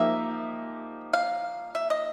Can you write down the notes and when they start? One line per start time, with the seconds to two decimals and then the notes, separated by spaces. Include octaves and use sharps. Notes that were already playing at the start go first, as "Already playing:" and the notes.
Already playing: F3 A#3 D#4 G4 E5
1.13 F5
1.75 E5
1.90 D#5